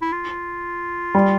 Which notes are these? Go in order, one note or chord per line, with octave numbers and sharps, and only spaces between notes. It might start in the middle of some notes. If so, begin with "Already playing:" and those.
E4
F4
G3